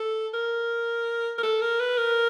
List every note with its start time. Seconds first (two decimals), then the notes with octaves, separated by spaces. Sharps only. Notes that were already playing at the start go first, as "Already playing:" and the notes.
Already playing: A4
0.34 A#4
1.38 A#4
1.43 A4
1.61 A#4
1.80 B4
1.98 A#4